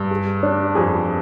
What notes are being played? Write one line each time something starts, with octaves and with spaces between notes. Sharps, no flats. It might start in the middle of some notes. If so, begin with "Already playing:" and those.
Already playing: G2
G#4
D4
F2 G#4